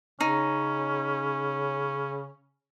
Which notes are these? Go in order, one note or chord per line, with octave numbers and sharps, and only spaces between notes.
C#3 C#4 D#4